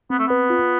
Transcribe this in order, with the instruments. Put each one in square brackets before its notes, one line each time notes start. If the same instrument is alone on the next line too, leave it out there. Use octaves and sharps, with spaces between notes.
[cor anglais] B3 [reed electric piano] C4
[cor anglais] A3
[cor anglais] B3 [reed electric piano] B4
[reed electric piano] F4